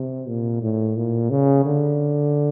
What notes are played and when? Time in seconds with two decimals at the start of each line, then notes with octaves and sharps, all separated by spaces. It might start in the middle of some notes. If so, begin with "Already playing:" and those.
Already playing: C3
0.27 A#2
0.62 A2
0.96 A#2
1.30 C#3
1.65 D3